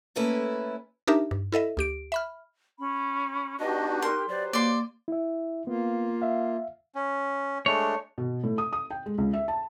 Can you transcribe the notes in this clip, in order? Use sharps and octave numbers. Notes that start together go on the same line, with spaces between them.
A3 A#3 C#4 E4 A4 B4
D4 D#4 G4 A#4 E5
G2
E4 A4 D#5 E5
D2 G4 D7
E5 B5 F6
C#4 B5
B3 D4 D#4 F#4 G4 D#5 F#6
A#4 C6
F#3 G4 B4 C5 D5
A#3 D5 C6
E4 E5
A#3 B3 F4
E5 F5
C#4
G#3 A3 D4 C#5
B2
A2
D#6
D#6
G5
G#3
C#2
E5
A5